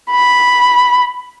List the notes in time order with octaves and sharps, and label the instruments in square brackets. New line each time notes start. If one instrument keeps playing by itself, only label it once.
[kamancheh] B5